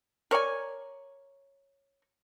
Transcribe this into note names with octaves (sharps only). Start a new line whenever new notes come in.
A#4 C#5 D5 G#5